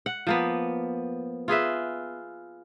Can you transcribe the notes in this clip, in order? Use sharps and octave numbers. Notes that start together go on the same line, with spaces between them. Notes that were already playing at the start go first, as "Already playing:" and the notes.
F#5
F3 A#3 B3
F4 G#4 B4 E5